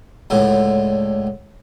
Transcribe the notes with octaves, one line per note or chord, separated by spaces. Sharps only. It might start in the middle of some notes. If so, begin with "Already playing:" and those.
C#2 A2 D3